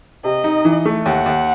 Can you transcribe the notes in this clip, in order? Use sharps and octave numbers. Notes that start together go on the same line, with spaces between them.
C3 D#5
D#4
E3
A3
D#2 F#5
D#2